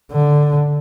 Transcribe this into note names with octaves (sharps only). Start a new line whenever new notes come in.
D3